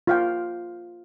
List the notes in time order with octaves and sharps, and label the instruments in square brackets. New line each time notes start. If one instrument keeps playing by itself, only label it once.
[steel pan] F4 F5 G5